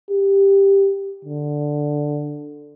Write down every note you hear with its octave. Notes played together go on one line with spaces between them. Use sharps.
G4
D3